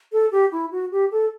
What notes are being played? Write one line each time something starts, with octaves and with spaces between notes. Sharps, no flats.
A4
G4
E4
F#4
G4
A4